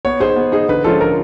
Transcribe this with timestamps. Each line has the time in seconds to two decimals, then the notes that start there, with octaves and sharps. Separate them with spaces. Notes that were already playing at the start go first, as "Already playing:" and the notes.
0.05 B3 C#5
0.20 D#4 G#4 C5
0.36 B3
0.52 D#4 G#4
0.68 D3 B4
0.84 F3 G#3 C#4 F4 A4
1.01 D3 A#4